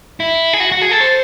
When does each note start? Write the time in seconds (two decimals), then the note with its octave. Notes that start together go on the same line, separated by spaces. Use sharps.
0.20 E4
0.53 G#4
0.60 F#4
0.72 F#4
0.81 G#4
0.91 A4
1.01 C5